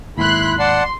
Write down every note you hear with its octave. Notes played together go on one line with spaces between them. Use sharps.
D#2 G#2 E4 B5 C6 F#6
D5 F#5 A5 C6